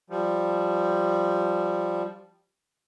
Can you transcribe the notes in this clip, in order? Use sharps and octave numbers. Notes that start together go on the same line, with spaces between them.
F3 G3